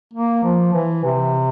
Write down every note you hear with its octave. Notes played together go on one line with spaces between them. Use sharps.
A#3
F3
E3
C3